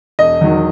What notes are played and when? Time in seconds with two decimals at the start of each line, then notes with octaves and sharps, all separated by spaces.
0.19 E1 D#5
0.41 E2 D#3 F#3